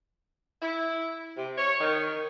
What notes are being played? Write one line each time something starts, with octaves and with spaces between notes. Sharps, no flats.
E4
C3
C#5
D#3